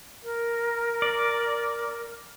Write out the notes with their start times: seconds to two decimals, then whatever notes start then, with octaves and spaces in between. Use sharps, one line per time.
0.24 A#4
1.02 D5